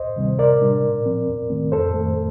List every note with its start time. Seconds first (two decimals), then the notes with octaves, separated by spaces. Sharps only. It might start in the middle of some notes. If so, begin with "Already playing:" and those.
Already playing: D2 C5 D#5
0.16 C3 D#3 G3 C4
0.39 C3 A#4 D5
0.61 G3 D4
0.83 A#2
1.06 F3 C4
1.28 D#2
1.50 D#3 A3 C4
1.72 F2 A4 C5
1.94 D#3 A3